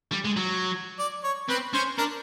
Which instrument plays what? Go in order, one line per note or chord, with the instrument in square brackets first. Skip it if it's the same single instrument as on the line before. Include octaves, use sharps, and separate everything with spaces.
[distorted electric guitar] G3
G#3
F#3
[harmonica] D5
C#5
[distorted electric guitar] C4 [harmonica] B4
[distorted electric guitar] C#4 [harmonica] C5
[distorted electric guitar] D4 [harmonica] A#4